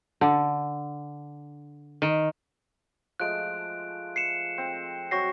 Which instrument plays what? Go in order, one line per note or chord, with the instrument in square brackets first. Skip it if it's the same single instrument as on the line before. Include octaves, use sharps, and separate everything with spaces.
[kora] D3
[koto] D#3
[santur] F3 G#3 A3 [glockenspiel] F#6 D7
[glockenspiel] C7 C#7 E7
[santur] C4
[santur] F#3 C4 [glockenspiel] C#6 A#6 C7